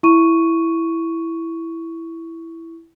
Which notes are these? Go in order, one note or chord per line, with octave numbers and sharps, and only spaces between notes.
E4 C#6 D#7